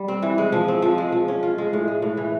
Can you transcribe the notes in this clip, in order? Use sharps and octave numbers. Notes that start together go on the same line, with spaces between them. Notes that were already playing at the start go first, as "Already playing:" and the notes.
Already playing: G3
C4
E3
G#3
F3
C4
F3
G#3
F3
C#4
F4
G#3
A2
G#3
A2
E3